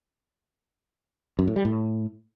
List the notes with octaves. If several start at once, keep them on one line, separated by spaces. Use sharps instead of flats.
F#2
A2
G3
A2